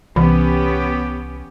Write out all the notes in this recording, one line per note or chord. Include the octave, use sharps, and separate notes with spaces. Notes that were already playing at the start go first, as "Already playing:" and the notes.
C2 E3 B3 C#4 G4